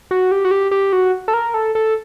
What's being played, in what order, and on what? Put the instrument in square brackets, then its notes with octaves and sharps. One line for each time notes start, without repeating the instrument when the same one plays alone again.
[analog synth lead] F#4
G4
F#4
G4
G4
F#4
A4
A#4
A4
A4